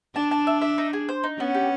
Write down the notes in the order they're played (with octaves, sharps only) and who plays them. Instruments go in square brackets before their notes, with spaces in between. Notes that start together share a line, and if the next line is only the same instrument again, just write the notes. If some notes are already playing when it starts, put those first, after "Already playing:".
[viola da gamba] D4 [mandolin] A5
[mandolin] A5
E5
E5
D#4
G#4
C5
D#4
[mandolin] B3 [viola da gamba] C#4
[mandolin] G4